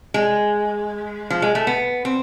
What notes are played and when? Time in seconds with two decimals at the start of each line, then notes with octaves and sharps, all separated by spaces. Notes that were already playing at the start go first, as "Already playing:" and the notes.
0.14 G#3
1.30 F3
1.42 G#3
1.55 A3
1.67 B3
2.05 C4